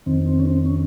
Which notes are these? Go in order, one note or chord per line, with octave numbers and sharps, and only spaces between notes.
F2 D#3 C4
C4
C#4
C4
C#4